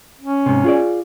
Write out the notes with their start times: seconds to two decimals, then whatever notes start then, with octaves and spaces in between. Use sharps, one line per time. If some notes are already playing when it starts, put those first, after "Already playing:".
0.20 C#4
0.46 G#2 C3
0.64 F4 G#4 D5